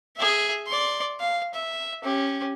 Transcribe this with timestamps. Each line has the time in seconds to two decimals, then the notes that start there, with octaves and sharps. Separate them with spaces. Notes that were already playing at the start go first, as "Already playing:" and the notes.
0.17 G#4 E5
0.67 D5 C6
1.20 F5
1.53 E5
2.03 C#4 G4